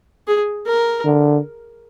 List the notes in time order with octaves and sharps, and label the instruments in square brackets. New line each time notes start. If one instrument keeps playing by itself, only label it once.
[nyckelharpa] G#4
A#4
[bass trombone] D3